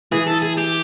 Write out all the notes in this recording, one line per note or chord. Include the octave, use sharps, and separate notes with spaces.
E3 G#4
A4
G#4
G4